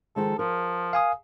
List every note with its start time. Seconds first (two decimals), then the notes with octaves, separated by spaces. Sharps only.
0.16 D#3 F3 G#3 A4
0.39 F3 A#4
0.93 F5 G#5 D#6